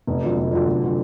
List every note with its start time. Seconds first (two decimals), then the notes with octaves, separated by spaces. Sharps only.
0.07 F1
0.22 F2 D3 F#3
0.37 F1
0.52 F2 D3 F#3
0.68 F1
0.83 D3 F#3